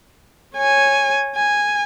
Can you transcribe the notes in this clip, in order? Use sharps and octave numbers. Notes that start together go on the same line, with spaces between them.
C#5 G#5
G#5